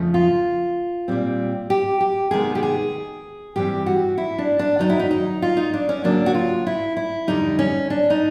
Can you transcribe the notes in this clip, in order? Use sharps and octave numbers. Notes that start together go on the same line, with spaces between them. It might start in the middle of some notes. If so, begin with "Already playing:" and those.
Already playing: F2 C#3 F3 A3
F4
A#2 G3 C4
G4
G4
C3 D#3 G#3 B3 G#4
G4
G#4
G2 E3 G3 C4 G4
F#4
E4
D4
D4
F#2 D#3 F#3 D#4
E4
D#4
D#4
F4
D#4
D4
C#4
D2 C#3 F#3 A#3 D4
F#4
F4
E4
E4
F2 D3 G3 D#4
C#4
D4
D#4